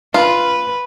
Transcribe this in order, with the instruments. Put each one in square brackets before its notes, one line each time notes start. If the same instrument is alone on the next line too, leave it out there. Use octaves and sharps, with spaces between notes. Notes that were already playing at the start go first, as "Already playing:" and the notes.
[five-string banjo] F4 [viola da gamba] B4